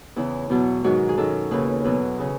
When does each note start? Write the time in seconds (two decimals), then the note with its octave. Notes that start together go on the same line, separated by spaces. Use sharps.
0.16 E2 C#3 E3 E4
0.50 E2 B2 F#3
0.84 G#2 D#3 F#3 F#4
1.09 G#4
1.18 F#2 D#3 F#3 A4
1.51 D#2 C#3 E3 B4
1.84 E2 B2 F#3 B4
2.18 C#3 E3